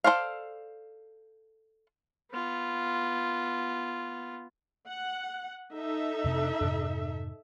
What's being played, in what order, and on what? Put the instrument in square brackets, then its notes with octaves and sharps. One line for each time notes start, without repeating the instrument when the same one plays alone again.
[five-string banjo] A4 A#4 C5 D5 F5
[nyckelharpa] B3 F4
[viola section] F#5
D#4 A4 E5
[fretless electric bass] F2 C3 C4
F2 G#2 C3